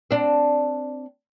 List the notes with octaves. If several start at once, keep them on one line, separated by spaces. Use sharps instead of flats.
C4 D4